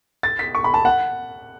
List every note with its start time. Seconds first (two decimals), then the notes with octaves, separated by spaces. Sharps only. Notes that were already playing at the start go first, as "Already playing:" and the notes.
0.23 A6
0.39 B6
0.55 C#6
0.64 B5
0.74 A5
0.85 F#5